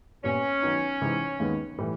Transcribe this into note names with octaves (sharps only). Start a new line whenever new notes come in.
A#2 G3 B3 C#4
D#3 F#3 B3 D#4
C3 E3 G#3 C4 D#4
D#2 D#3 G#3 B3
A2 E3 G3